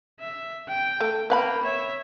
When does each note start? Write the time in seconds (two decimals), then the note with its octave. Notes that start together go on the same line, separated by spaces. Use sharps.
0.20 E5
0.69 G5
1.00 A3
1.30 A#3 B4 F#5 G5 B5
1.64 C#5 E5